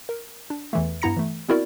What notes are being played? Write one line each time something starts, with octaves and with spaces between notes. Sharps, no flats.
A#4
D4
E2 E3 A3
G2 B3 E4 A#5 A#6 C#7
E3 A3
B3 C4 E4 F#4 A#4 D5